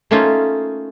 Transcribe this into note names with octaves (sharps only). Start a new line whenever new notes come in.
A3 A#3 C#4 D#4 F4